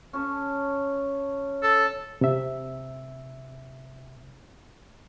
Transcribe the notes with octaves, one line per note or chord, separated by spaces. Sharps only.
C#4 A4 C#5
A4
C3 E5